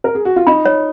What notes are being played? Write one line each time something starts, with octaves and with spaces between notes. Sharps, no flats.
A#4
G#4
F#4
F4
D#4 B5
C#5